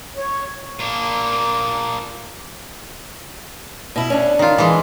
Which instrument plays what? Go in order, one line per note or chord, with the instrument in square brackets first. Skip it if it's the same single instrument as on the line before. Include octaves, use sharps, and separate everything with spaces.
[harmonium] C#5
[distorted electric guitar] A#2 D4 [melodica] A#3
[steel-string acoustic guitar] B2 E4
C#4 D4
[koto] D#3 F4
E3 G#3